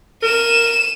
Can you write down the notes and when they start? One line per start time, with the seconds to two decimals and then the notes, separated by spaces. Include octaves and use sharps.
0.23 A#4 D#7 E7